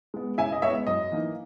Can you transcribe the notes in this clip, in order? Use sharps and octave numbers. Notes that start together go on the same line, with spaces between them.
G#3 B3
C#3 E5 G#5
D#5
G#3 B3 C#5 E5
F#2 D#5
E3 A#3 D#4